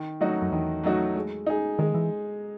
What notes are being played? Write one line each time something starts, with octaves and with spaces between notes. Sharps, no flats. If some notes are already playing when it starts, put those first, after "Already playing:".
Already playing: D#3
F#3 A3 D#4 F#4
F#2
E2 D#3
F#3 A3 D#4 F#4
G#3
D#4 G#4
D#3 G#3
E3